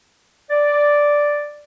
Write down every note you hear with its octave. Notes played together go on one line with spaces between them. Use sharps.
D5